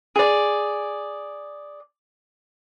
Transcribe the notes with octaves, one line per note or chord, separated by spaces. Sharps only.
G#4 D5